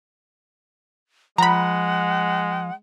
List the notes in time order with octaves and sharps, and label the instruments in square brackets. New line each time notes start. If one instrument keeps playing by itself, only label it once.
[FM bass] F3 [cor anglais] G#3 [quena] F#5 [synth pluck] A#5 B5